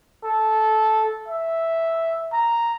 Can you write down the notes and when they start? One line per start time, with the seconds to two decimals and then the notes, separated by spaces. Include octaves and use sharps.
0.24 A4
1.28 E5
2.33 A#5